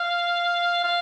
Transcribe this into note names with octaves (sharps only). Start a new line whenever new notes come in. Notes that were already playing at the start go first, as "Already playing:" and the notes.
Already playing: F5
F5